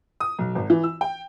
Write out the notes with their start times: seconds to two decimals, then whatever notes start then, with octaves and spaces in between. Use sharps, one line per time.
0.20 D#6
0.39 B1
0.55 G#1
0.70 E3
0.84 E6
1.01 G5